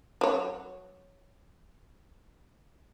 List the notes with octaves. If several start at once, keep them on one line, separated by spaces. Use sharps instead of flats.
F#3 C#5